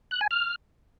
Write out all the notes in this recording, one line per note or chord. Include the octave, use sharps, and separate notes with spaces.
F#6
G#5
F6